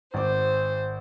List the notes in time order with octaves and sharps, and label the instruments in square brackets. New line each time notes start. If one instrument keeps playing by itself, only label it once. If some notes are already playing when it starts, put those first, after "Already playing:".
[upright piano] G#1 D6 [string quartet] C5